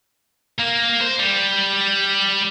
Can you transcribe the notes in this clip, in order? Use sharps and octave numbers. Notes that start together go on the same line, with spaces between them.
A#3
C5
G3